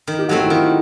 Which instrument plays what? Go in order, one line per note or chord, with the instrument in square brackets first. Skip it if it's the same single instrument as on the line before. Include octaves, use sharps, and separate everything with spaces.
[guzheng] D#3
[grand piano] G4
[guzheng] F#3 A3 C4 [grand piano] F#4
[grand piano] F#4
E4
[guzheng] D#3 [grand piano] F4